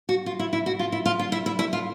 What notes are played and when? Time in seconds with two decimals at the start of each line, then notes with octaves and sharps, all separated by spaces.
0.09 F#4
0.26 F4
0.39 E4
0.53 E4
0.66 F#4
0.79 F4
0.92 E4
1.06 F4
1.19 F4
1.32 E4
1.46 E4
1.59 E4
1.73 F4